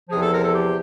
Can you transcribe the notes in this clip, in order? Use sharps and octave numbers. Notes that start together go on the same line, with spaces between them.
E2 C3 F3 G#4
A4
A#4
A4
G4